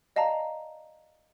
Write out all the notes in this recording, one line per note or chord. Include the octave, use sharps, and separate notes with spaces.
D5 D#5 F5 A5 A#5